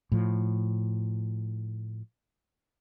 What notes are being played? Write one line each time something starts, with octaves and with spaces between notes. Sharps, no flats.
A2 F3